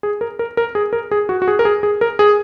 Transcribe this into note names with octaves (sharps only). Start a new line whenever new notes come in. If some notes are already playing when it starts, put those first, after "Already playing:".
G#4
A#4
A#4
A#4
G#4
A#4
G#4
F#4
F#4
G#4
A#4
G#4
G#4
A#4
G#4